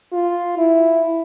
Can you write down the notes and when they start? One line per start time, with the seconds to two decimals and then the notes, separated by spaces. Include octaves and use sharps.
0.13 F4
0.58 E4